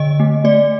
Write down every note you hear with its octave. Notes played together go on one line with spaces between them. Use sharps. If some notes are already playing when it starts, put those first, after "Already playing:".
Already playing: D3 D#5
A3
A3 D5